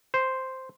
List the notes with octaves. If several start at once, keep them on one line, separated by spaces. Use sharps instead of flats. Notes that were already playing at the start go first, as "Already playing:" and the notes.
C5